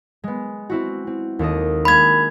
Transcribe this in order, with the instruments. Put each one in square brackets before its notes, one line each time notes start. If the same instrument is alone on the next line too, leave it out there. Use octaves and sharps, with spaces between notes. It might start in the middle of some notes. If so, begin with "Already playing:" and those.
[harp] G#3 B3
C4 E4 F#4
C4
D#2 A4 D#5
[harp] G#3 A#3 D4 [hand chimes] B5 G#6